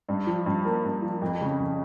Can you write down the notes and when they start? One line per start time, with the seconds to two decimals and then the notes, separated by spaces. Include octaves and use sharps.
0.09 G2
0.27 F3
0.46 G2
0.65 A#3
0.84 G2
1.02 F3
1.22 F2
1.41 C#3
1.59 F2